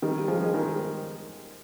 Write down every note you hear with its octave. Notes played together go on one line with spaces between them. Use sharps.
D#3 G3
G3
F3 G#3
G#3
D#3 G3